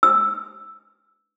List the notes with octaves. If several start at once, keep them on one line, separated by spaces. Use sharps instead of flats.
E6